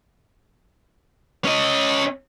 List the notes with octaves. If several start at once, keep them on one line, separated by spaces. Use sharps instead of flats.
C#4 D#5